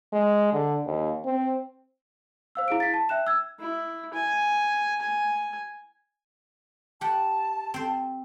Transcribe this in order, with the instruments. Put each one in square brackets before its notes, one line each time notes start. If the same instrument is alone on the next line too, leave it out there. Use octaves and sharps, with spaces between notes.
[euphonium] G#3
D3
D#2
C4
[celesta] C5 F5 E6
E4 G#4 F5 D7
A6 B6
A5
E5 G5 F#6 E7
E6 G#6
[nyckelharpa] E4
G#5
G#5
[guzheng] G4 F#5 [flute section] A5
[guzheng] C4 C5